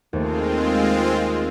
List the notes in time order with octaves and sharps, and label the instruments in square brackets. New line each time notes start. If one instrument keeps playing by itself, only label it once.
[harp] D#2 A3 [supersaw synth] G#3 C4 F4